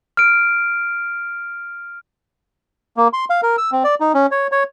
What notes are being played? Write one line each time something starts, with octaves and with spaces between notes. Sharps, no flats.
F6 D7
A#3
C6
F5
A#4
E6
C4
D5
D#4
C#4
C#5
C#5